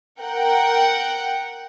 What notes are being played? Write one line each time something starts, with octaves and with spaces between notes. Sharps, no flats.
A#4 F#5 G5